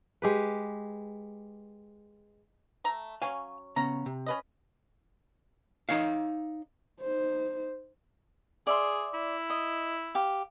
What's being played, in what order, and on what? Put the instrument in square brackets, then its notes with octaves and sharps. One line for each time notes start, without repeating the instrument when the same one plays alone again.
[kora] G#3 G4 B4
[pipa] A3 A#5
[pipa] F#3 C#4 [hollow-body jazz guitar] F5 G#5
[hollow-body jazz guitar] C#3 B3 C#4 [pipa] A#5
[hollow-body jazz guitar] C3
[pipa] C#4 B4 D#5
[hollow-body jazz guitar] D#4 C#5 F5
[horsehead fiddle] D#4 C5
[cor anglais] G#4 [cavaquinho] D5 E5 C6
[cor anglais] E4
[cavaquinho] D#5
G4 F5